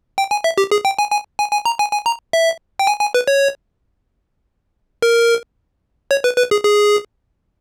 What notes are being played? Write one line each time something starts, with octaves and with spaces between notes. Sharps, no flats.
G5
G#5
E5
G4
G#4
G5
G#5
G#5
G#5
G#5
A#5
G#5
G#5
A#5
E5
G5
G#5
G#5
B4
C#5
A#4
C#5
B4
B4
G#4
G#4